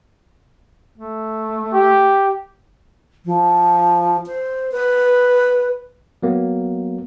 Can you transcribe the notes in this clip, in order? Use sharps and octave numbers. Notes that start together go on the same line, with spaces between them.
A3
G4
F3
C5
B4
F#3 A#3 B3